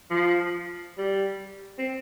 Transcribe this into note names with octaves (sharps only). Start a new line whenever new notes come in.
F3
G3
C4